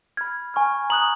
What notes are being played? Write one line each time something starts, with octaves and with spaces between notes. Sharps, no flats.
B5 F6 G#6
G#5 C#6 F6
A#5 D#6 F#6 F#7